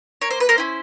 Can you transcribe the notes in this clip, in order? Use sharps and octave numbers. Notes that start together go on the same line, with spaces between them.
A#3 C#5
C5
B4
A#4 C5
C#4 E4